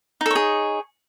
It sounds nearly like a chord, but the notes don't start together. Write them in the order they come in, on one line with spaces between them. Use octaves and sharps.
D#4 A4 C#5 G#4